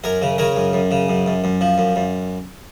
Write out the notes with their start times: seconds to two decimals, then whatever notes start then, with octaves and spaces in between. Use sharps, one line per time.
0.04 F#2 A#4 C#5
0.22 C#3
0.38 C#3 A#4 C#5
0.56 F#2
0.73 F#2
0.91 C#3
1.09 F#2
1.26 F#2
1.44 F#2
1.61 F3
1.78 F#2
1.96 F#2